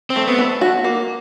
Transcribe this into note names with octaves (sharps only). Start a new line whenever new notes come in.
C4
A3
B3
A3
F#4
A#3